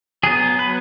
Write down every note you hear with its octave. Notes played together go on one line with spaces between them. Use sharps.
F#3 B3 G#4
B4